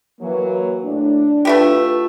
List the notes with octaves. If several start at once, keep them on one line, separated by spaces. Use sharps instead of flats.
E3 F#3 A#3
A2 D4
A3 E4 F4 G4 B4